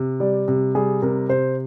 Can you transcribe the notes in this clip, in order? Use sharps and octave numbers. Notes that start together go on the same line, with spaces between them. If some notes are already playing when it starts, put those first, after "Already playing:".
Already playing: C3
G3 D5
C3
G3 G#4
C3 A#4
C3 C5